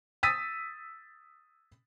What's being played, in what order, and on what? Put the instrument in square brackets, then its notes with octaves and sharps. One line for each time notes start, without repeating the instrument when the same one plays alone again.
[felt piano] D#6 E6 A6 B6 D#7